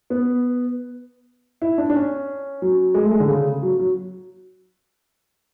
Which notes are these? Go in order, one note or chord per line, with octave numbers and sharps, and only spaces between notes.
B3
E4
D4
D4
C#4
F#3
G#3
A3
G#3
D3
C#3
F#3
F#3